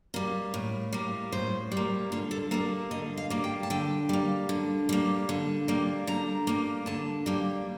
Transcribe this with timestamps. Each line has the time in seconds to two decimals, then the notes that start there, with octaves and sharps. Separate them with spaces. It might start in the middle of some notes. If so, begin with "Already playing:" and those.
0.14 G3 A#3
0.54 A2
0.93 G3 A#3
1.32 A2 C5
1.72 G3
1.77 A#3
2.12 D3 F4
2.31 A4
2.51 G3 A#3 A4
2.91 D3 D#5
3.17 F5
3.30 G3 A#3
3.44 G5
3.63 A5
3.70 D3 G5
4.09 G3 A#3
4.49 D3
4.89 G3 A#3
5.29 D3
5.68 G3 A#3
6.07 D3 A#5
6.47 G3 A#3
6.86 D3 A5
7.26 G3 A#3